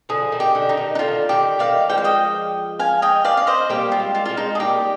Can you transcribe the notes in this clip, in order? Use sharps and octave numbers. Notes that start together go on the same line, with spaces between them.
D3 F3 G#4
D#3
G4
D3
D#4
D#3
D#4
D3 F4
D#3 G4
D#3 G3 D5 F5
F3 G#3 G5
F5
D#5 G5
F5 G#5
D#5 G5
D5 F5
F5
C5 D#5
G3 A#3 G4
F4
G#3 C4
F4
G#3 C4 F4
D#4
G#4
G3 A#3 G4